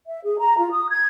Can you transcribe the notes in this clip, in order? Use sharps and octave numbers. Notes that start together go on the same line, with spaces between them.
E5
G#4
A#5
F4
D#6
G#6